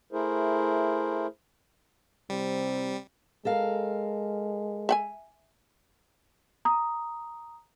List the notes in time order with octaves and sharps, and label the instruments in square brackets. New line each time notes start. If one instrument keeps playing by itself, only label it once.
[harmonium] A3 E4 G#4 A#4 C5
[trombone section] C2 C3 C4 [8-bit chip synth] G3
[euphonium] G#3 [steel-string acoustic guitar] A4 A#4 F5
[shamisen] E5 F#5 G#5
[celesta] A#5 D#6